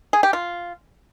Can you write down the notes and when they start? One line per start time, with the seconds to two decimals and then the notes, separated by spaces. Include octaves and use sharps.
0.13 G#4
0.23 G4
0.33 F4